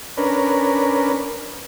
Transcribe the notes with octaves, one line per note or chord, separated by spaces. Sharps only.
C#4 D4 A#4 B4